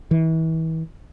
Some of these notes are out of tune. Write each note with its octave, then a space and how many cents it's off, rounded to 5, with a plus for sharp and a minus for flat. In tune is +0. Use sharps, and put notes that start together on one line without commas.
E3 -35